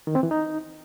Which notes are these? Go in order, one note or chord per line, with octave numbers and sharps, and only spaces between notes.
D#3
C4
E3
D#4